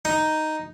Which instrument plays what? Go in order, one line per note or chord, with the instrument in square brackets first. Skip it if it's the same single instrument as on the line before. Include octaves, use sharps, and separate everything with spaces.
[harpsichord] D#4